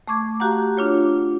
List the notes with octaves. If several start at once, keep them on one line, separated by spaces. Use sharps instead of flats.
A3 C#6 D6 G#6
F#4 G4 F5 F#5 A#5
D4 F4 C#5